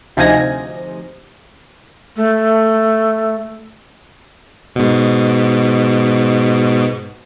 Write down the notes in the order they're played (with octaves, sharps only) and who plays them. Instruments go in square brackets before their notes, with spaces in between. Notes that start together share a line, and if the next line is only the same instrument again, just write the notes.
[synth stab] D2 C3 F3 D#4 G#5 A#6
[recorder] A3
[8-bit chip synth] G#2 B2